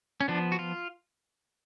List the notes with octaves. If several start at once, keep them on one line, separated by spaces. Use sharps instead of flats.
C#4
F3 B3 D4
F#4
F4